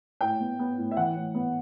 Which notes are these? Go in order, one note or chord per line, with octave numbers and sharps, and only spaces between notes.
A2 G5
B3
B3
A2
E5
E3 F#5
A2
B3